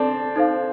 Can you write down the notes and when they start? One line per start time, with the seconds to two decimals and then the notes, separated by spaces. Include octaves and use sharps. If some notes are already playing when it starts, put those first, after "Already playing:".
Already playing: C4 D4 A4 D5 A5
0.36 D#4 A4 C5 F5